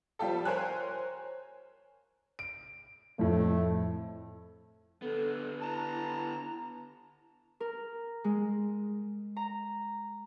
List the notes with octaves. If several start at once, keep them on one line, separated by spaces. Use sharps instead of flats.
F3 G3 F4 G4 A4
A#4 C5 C#5 G#5 F#6
D7
F2 A2 A3
D3 B3 A4
E4 A5 A#5
A#4
G#3
A#5